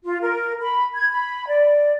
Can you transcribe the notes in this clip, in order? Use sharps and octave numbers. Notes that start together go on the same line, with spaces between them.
F4
A#4
B5
G#6
B5
D5